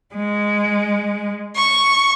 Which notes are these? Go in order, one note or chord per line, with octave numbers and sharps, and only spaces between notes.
G#3
C#6